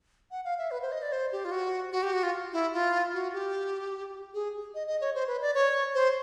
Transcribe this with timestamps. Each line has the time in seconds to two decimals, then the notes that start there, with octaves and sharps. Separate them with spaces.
0.31 F#5
0.45 F5
0.58 E5
0.71 B4
0.82 C5
0.92 D#5
1.02 D5
1.12 C5
1.32 G4
1.45 F4
1.51 F#4
1.92 F#4
2.03 G4
2.13 F#4
2.23 F4
2.53 E4
2.73 F4
3.14 F#4
3.33 G4
4.34 G#4
4.75 D#5
4.87 D#5
5.01 C#5
5.15 C5
5.27 B4
5.42 D5
5.54 C#5
5.95 C5